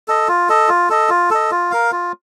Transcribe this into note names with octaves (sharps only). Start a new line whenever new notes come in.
A4 D#5
F4
A4 D#5
F4
A4 D#5
F4
A4 D#5
F4
A#4 F5
F4